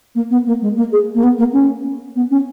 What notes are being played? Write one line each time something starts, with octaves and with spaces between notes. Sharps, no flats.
A#3
B3
A#3
G#3
A#3
G#4
A#3
B3
A#3
C#4
B3
C#4